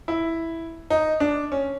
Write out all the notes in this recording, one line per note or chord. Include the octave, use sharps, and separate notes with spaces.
E4
D#4
D4
C#4